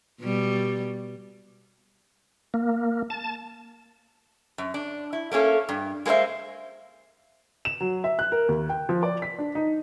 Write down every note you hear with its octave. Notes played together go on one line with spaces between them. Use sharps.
B2 G3
A#3
A5
F#2
D4
E4
A3 A#3 C#4 A4
G2
G#3 A#3 A4 C5 E5
E7
F#3
E5
F#6
A#4
D#2
G5
F3
D5
B6
D4
D#4